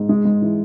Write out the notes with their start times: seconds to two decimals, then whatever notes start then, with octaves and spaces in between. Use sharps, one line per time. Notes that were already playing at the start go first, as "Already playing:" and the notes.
Already playing: G#2
0.09 G#3
0.25 G#2
0.42 E3